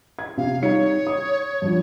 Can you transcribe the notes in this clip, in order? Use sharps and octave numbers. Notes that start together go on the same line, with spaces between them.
G#6
C3 F5
G3 D#4 C#5 C#7
D#6
G2 F3 F#4